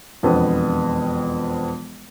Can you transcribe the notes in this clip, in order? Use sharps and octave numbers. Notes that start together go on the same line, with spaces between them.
E1 F2 B3 C4 D4